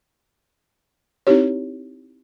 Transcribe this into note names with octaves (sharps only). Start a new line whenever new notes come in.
C4 D#4 E4 G4 C#5